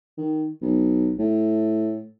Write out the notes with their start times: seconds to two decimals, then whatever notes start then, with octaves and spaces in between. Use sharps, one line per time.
0.17 D#3
0.62 B1
1.18 A2